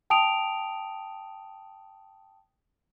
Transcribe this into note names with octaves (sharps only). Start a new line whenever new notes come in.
G5 A5 D#6 D7 F7